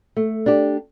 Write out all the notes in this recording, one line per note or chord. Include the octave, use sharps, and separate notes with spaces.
A3
D4 G4